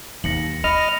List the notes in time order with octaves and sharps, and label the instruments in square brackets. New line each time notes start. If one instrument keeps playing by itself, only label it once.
[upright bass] D#2 [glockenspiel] A#6 C#7 F#7
[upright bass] D4 [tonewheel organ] D#5 F6 [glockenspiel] B5 A#6 C#7